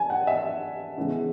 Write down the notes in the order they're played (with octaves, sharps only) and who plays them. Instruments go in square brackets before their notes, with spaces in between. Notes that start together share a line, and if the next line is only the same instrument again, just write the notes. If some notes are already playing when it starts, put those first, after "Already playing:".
Already playing: [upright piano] G#5 A5
F#5
E5
C#3 E3 G#3 B3